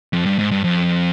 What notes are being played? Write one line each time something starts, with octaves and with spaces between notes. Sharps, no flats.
F2
G2
G#2
G2
F2